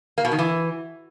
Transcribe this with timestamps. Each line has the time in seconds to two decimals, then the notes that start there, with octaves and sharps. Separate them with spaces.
0.18 A#3
0.25 B2
0.32 D#3
0.39 E3